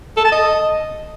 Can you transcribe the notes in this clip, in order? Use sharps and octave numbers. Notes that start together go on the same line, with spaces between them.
A4
A5
D#5